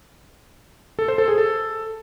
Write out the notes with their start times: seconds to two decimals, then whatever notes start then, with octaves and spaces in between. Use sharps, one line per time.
0.99 A4
1.08 C5
1.18 A4
1.28 G#4
1.38 A4